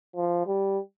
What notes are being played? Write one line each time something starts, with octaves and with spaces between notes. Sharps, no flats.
F3
G3